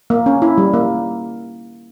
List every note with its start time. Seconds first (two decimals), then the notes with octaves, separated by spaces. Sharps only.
0.10 A#3
0.26 C#4
0.42 E4
0.58 G3
0.73 A#3